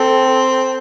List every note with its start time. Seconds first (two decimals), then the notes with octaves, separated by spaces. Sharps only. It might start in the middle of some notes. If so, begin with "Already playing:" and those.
Already playing: C4 A4